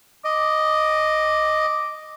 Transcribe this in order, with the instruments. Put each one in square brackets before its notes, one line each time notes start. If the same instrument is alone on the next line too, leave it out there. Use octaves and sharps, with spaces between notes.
[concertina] D#5 [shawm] D6